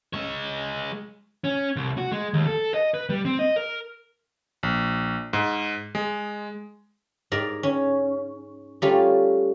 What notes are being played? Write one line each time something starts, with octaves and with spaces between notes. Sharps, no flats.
G#3 C#5
C#4
C2
F#4
G#3
D#2
A4
D#5
B4
G3
C4
D#5
A#4
A#1
G#2
G#3
G#2 A#4 D5
C#4
G3 A3 A#3 C#4 F4 A4